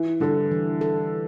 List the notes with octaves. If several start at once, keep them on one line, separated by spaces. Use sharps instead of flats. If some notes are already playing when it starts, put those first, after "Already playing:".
Already playing: E3
D3 G3 D4 A4
E3
A4